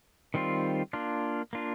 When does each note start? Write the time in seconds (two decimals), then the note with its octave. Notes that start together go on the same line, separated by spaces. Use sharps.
0.34 D#3 G3 C4 F4
0.93 A#3 D4 F4
1.53 A#3 D4 F4